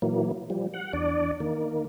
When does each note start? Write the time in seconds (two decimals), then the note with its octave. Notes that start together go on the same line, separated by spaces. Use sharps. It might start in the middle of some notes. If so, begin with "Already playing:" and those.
0.02 A#2 E3 F#3 A#3
0.50 F3 G3
0.74 F#5
0.93 E2 D4 D5
1.40 D#3 A#3